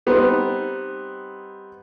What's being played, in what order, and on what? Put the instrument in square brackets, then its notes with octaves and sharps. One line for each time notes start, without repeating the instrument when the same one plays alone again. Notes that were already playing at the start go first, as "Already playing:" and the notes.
[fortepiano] G3 B3 C4 D#4